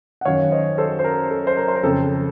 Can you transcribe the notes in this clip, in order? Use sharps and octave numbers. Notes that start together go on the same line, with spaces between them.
F#5
F#2 D#3 C#5 F5
C5 D#5
A4 C5
C5
A#4
A4
C5
A#4
C5
A#4
F2 C#3 A4